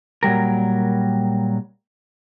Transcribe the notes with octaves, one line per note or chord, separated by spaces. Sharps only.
A#2 F#3 G3 A#4